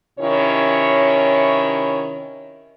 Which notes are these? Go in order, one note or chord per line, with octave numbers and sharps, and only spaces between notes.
C3 D#3 C#4 E4 C#5